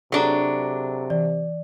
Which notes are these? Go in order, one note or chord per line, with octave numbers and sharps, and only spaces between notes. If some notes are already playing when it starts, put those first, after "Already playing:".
C3 F#3 D4 G#4 A4 A#5
E3 D5